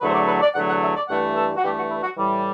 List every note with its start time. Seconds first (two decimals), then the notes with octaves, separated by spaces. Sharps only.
0.01 E2 D3 F#3 A3 B4
0.08 C5
0.14 D5
0.27 B4
0.42 D5
0.54 E2 D3 F#3 A3 F#5
0.68 F#5
0.82 E5
0.96 D5
1.09 G2 E3 A3 F#5
1.36 A4
1.56 F#4
1.63 G2 E3 A3 G4
1.76 F#4
1.90 E4
2.03 F#4
2.17 A2 E3 G3